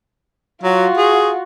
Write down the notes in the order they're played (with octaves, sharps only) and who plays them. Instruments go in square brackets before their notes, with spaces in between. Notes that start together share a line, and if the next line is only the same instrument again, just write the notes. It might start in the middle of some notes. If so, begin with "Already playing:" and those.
[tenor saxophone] F#3 [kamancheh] F4 F#4
[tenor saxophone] G#4